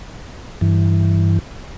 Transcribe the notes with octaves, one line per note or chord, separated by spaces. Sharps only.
G2 E3